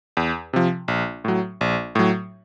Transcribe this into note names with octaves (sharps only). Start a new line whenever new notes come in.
E2
C3 F3
A#1
A2 F#3
A#1
A2 F#3